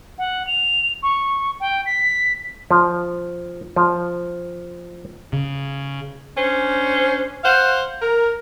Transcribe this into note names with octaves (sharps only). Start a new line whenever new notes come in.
F#5
F7
C#6
G5
B6
F3
F3
C#3
C#4 D4 C5
C5 F5 F#5
A#4